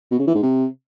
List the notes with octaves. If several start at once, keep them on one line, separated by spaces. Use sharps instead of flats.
B2
C#3
E3
G#2
C3